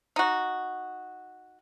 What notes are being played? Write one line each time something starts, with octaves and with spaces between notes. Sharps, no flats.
D#4 F#4